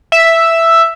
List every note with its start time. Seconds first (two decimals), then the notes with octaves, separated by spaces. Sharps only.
0.12 E5